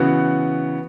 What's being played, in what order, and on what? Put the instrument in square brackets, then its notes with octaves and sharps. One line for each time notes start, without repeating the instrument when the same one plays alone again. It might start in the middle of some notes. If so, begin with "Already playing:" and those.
Already playing: [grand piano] C#3 E3 B3 F#4